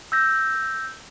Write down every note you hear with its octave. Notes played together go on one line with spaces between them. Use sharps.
E6 G6 A#6